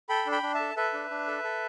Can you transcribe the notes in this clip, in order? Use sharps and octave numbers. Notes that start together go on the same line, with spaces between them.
A4 G5 B5
D4
G5 B5
D4
E5 A5
A4
A4 B4 E5
D4
D4
A4
A4